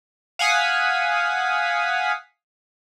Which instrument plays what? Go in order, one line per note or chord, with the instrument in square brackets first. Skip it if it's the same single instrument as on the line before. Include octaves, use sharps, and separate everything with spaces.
[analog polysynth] F5 F#5 G#5 D#6 B6